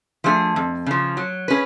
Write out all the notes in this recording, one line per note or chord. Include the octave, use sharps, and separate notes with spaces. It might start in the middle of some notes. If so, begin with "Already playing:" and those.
F3 A3 D4 G#4
F2
C#3 F3
F#3
C#4 G#4 B4